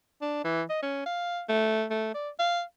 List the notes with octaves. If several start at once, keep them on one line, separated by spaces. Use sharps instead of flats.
D4
E3
D#5
C#4
F5
A3
A3
D5
F5